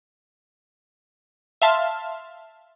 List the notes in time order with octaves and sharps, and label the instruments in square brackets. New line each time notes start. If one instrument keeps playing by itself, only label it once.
[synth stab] E5 F5 A5 C6 F6